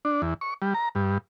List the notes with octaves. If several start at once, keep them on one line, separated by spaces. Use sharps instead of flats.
D4
E2
C#6
G3
A#5
G2